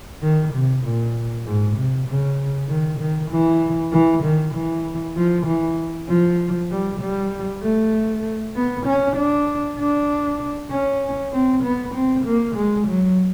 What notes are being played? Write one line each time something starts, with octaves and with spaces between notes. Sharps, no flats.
D#3
C3
A#2
G#2
C3
C#3
D#3
D#3
E3
E3
D#3
E3
F3
E3
F3
G3
G3
A3
B3
C#4
D4
D4
C#4
C4
B3
C4
A#3
G#3
F#3